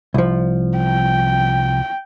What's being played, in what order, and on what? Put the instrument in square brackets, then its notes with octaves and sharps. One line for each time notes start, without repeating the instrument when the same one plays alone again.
[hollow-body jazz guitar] C2 F3
[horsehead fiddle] G5